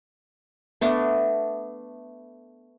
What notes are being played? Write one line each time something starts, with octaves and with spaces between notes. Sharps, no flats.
A3 B3 D4